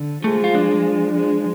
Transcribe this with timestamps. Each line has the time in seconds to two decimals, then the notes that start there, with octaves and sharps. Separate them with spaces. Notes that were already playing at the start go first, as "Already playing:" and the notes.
Already playing: D3
0.23 F3 G#3 A3
0.44 F4
0.55 D4
1.15 F3 G#3